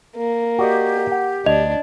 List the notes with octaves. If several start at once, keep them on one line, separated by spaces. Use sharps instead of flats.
A#3
F#4 G4 D5 D#5
F#5
D2 D4 D#5